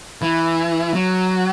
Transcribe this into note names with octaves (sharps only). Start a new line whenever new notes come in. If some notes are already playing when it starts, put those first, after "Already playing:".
E3
F#3